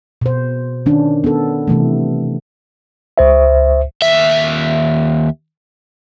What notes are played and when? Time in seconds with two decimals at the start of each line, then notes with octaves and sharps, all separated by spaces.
0.21 B2 C5
0.86 D#3 C#4 D4
1.24 B3 A4
1.68 C3 E3 A3
3.18 C#2 C5 E5
4.02 D#2 E5